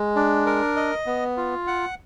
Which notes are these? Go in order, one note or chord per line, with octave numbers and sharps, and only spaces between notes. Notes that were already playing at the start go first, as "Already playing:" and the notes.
Already playing: G#3
D4
A#4
D#5
B3
F4
F#5